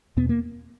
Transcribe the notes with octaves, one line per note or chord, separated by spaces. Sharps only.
E2 B2 B3
A#3